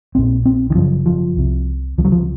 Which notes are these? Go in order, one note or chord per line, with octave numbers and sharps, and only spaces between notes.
A#1 A#2 C4
C4
D#3
F#1 F#2 C#3 F3
F3
C2 C3
C#2 C3 F3 F#3
F3